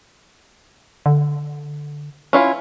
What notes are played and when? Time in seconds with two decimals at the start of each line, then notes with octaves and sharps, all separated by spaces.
1.06 D3
2.33 C#4 E4 F4